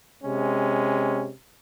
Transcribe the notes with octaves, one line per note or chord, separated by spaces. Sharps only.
C3 G#3 C#4